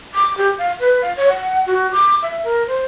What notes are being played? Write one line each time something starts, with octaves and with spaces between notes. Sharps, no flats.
D6
G4
F5
B4
F5
C#5
F#5
F#4
D6
E5
A#4
C5